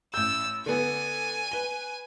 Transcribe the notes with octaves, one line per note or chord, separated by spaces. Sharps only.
A1 E6 G6
D3 B3 G#5
B4 G7